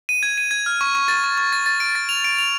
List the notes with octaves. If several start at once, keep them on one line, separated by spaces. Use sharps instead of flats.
D#7
G#6
D#7
G#6
F6
C#6
C#6
A6
C#6
C#6
A6
A6
D7
A6
F7
D7
F7